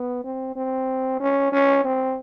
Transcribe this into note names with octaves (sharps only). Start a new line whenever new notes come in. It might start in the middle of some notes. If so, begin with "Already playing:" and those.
Already playing: B3
C4
C4
C#4
C#4
C4